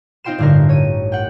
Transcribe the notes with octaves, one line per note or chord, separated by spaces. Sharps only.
C4 D#4 F4 G5 C6 E7
A1 G2 D3 D#4 A#4
C#5 D#7
F#5 G5